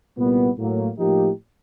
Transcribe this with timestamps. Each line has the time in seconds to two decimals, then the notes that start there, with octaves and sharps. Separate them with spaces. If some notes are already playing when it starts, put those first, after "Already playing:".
0.18 C2 A#2 G3 B3
0.58 A2 F#3 A#3
0.98 A2 F3 A#3 D#4 G4